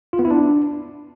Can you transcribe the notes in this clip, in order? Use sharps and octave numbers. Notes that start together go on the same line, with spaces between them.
F4
B3
E4
D4